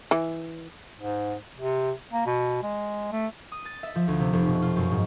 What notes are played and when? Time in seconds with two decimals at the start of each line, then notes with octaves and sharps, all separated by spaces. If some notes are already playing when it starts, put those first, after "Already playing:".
0.11 E3
1.01 G#2
1.57 C3
2.13 A#3
2.26 B2
2.63 G#3
3.12 A3
3.52 D#6
3.65 A6
3.83 E5
3.96 F3
4.08 D2
4.20 C3
4.33 F1
4.47 B2
4.62 F4
4.76 F#2
4.91 G#2